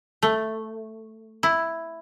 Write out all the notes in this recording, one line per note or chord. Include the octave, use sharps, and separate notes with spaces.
A3
E4